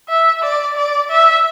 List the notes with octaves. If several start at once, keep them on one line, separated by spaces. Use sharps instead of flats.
E5
D5
D5
E5